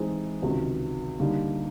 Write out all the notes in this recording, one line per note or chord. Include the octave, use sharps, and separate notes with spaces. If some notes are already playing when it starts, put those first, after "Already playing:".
Already playing: E3 G#3 C4 D#4 G#4
C#2 C3 D#3 F#3
D3 G3 A#3 D#4